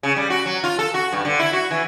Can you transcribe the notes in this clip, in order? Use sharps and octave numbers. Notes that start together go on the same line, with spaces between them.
C#3
G3
F#4
F#3
F4
A4
F#4
G2
D3
E4
F#4
E3